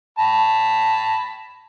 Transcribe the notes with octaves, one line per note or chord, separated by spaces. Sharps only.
A5 B5